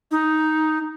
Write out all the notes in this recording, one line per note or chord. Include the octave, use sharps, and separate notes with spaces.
D#4